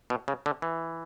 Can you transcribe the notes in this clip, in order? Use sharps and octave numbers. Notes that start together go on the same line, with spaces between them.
B2
C#3
D3
E3